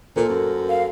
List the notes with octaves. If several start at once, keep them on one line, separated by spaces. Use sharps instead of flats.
A#2 A4 A#4 C5
F#2
F5